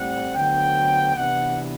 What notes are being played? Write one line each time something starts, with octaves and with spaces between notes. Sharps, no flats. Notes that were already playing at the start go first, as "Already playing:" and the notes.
Already playing: A2 G3 C4 F#5
D2 D3 F#3 B3 G5
E2 C3 E3 B3 D4 F#5